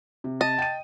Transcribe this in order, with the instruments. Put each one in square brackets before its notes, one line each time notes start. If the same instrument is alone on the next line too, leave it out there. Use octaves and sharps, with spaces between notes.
[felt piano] C3
[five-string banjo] D#5 [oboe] A5
[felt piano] G5 D#7